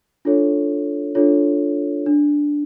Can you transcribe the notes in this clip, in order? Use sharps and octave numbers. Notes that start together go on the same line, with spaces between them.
D4 F4 A4 C#5
D4 F4 A4 C#5
D4